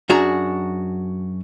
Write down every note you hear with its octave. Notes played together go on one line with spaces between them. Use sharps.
F#2 D4 F#4 G#4 A#5